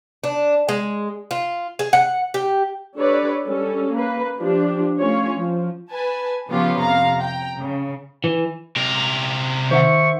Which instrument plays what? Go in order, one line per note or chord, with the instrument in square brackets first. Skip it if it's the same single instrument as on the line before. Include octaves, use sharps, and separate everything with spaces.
[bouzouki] D4
G#3
F4
G#4
F#5
G4
[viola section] D4 G4 A4 B4 C#5 D5
G3 C#4 A4
A#3 B4
F3 D4 G4
A3 C#4 F4 C#5
F3
[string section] B4 G#5 A5
C#3 F3 B3 C#4 F4 G4
F2 C3 F5 A#5
G5 A#5
C#3
[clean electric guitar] E3
[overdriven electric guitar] C3 A#4
[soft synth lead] D#3 [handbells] C5 E5 F#5 [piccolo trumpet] C#6